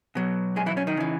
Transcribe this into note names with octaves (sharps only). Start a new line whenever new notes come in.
B2 F#3
G#3 G#4
E3 E4
C#4
D#3 D#4
C#3 E3